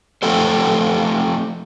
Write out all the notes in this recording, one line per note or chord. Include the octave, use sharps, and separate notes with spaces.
F3 A3 C4 G4 A4 C5